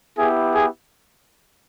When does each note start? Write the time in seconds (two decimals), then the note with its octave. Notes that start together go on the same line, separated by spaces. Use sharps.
0.18 B3 E4 G4 G#4
0.53 G#4